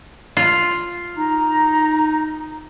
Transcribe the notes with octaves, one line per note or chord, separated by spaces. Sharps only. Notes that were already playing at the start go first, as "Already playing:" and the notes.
F4
D#4 A#5